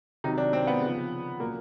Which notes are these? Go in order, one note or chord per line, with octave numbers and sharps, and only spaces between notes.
C3 D#3 F#3 D#4
D4
C4
B3
C#3 F3
A#2 F#3 A#3